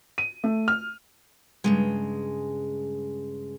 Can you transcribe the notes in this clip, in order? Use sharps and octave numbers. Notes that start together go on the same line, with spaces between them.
D#7
A3
F6
G2 C#3 G#3